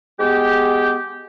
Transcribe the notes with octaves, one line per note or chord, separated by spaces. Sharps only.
G#3 B3 G4